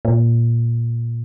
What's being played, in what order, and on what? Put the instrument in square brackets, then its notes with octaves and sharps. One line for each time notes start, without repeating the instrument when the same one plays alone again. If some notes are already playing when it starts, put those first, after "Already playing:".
[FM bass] A#2